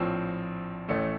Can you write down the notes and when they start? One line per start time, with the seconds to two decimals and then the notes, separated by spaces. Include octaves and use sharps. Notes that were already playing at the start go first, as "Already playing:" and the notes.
Already playing: A#1 A2 F3 C4
0.88 A1 A2 A3 C#4